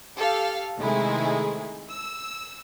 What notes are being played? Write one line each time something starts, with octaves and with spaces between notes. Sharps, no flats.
G4 A4 F5
C3 D#3 G#3 A3 E4 G#4
E6